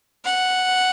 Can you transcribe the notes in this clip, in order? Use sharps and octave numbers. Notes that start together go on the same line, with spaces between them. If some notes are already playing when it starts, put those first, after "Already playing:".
F#5